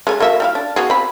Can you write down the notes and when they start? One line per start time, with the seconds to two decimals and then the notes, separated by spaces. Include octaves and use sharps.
0.07 G#3 A3 G#5
0.20 A#3 F#4 E5
0.40 G3 E4 F5
0.55 D4
0.76 B3 F#4 G#4
0.90 C4 B5